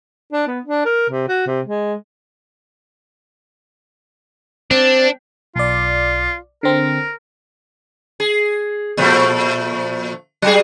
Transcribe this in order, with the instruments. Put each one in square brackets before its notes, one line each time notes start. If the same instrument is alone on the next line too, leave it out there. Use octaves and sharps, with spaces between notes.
[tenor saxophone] D4
B3
D4
A#4
C3
F#4
C3
G#3
[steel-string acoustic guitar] C4 [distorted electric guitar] D4
[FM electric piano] B1 D5 [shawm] F4
[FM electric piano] D3 C4 [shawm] A#4
[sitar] G#4
A#2 F3 A3
F#3 G3 G#4